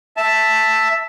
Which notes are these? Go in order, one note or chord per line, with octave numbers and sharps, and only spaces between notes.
E5 A5